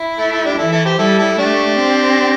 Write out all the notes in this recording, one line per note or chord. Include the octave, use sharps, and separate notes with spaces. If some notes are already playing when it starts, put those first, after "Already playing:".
Already playing: E4
A3
A3
D4 G4
E3 E4 A4
E4 A4
G4 C5
G3 E4 A4
E4 A4
A3 D4 G4
C4